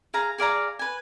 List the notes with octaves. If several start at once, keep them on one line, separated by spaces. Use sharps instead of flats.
G#4 F5 A#5
G#4 D5 F5 A#5
B4 G#5